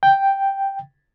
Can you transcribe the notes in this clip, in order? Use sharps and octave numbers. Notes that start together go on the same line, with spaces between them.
G5